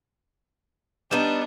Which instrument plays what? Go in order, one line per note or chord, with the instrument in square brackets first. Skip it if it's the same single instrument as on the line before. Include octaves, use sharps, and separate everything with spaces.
[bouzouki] G3 B3 D#4 [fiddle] D4 [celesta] G4 E7